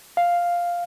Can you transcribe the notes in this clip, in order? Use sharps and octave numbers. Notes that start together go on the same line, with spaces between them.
F5